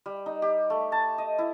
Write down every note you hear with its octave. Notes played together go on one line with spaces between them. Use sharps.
G3
D#4
G4
A3
A5
D#5
E4